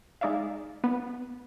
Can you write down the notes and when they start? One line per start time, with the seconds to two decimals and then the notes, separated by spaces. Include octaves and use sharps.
0.21 G#3 D#4 D5 E5 F5
0.84 B3